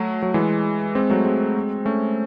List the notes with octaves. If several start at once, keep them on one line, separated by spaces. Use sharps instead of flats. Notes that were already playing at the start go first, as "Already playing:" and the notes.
Already playing: F#3 A3
F#3
E3 G#3
G#3 C4
F#3 A3
G#3 C4
A3 C#4